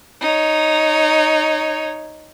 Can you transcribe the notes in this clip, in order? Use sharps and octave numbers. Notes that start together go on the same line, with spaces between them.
D#4 C#5